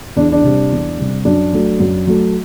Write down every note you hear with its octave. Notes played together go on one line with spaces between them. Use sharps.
E2 D4
D4
C3 G3
E2
C3 G3
F#2 D4
F#3 A3
F#2
F#3 A3